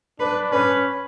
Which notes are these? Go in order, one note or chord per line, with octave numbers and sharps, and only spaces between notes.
D4 B4
C#4 B4